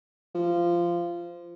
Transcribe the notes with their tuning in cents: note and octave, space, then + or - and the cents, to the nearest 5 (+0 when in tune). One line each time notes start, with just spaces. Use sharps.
F3 -15